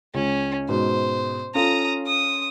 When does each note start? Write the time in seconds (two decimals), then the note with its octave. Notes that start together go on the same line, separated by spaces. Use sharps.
0.14 C#2 C#4
0.69 G#2 B2 C5
1.55 C#4 F4 A4 A#5 D#6
2.07 D#6